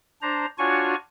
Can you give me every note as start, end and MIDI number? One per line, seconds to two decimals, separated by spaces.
0.22 0.46 62
0.22 0.46 72
0.22 0.46 82
0.59 0.95 62
0.59 0.95 65
0.59 0.95 66
0.59 0.95 73
0.59 0.95 80
0.59 0.95 85